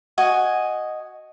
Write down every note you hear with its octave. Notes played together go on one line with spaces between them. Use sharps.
F#4 D#5 G#5